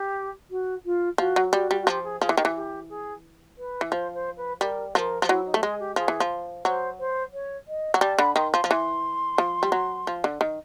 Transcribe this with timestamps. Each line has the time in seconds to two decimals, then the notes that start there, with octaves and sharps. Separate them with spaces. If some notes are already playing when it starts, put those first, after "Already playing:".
Already playing: G4
0.50 F#4
0.85 F4
1.18 F3 F#4
1.36 F#3
1.53 G3 F#4
1.71 G3
1.82 F#4
1.87 F3 G4
2.04 G#4
2.21 F3 G#4
2.29 E3
2.37 D#3 G4
2.45 E3
2.56 G4
2.90 G#4
3.58 B4
3.81 E3
3.92 F3 C5
4.14 C5
4.37 B4
4.60 G3 A#4
4.94 F3 A#4
5.22 F3
5.29 F#3 E4
5.46 D#4
5.54 A3
5.63 G#3 G#4
5.80 G4
5.96 F3 G#4
6.08 E3
6.20 F3
6.65 F#3 C5
6.99 C5
7.33 C#5
7.68 D#5
7.94 F#3
8.01 G3 A5
8.19 D3 B5
8.36 D#3 C6
8.53 F3 C6
8.64 F3
8.70 E3 C6
9.38 F3
9.63 G3
9.72 F#3
10.07 F3
10.24 D3
10.41 D#3